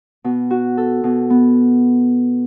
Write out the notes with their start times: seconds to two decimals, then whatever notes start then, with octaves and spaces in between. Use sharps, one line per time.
0.24 B2
0.50 F#4
0.77 A4
1.04 B2
1.30 B3